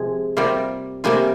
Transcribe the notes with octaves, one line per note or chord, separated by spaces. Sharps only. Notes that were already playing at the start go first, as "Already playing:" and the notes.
Already playing: C3 F3 G#3 C4 G#5
C3 G3 A#3 F4
C3 G3 A#3 F4 G#5